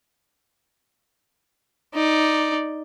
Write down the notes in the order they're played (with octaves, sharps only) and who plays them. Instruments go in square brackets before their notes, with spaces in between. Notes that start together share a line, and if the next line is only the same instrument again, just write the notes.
[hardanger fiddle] D#4 D5